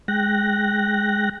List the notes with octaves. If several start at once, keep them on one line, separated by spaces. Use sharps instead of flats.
G#3 G5 F#6 A#6